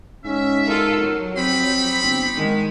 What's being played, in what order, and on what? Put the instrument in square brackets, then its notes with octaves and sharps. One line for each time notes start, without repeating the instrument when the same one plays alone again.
[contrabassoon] G#2 [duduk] C#4 [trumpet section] E5
[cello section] F4 A4 [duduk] A#4
[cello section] F#3
[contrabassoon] F2 [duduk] C4 [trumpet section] D#4 G4 B5
[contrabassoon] G1 [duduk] C4
[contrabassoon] G#2 [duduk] D#3 [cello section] G#3